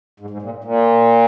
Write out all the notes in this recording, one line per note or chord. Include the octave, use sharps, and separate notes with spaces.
G#2
G#2
A#2
A#2